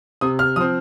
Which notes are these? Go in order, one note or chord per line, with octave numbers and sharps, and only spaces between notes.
C3 D#6
F6
F3 C4 D#6